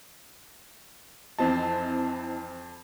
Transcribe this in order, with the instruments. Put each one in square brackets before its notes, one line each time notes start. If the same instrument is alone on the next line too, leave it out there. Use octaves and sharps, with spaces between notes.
[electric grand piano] F2 C5 A5 [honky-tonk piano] E3 C4 D#4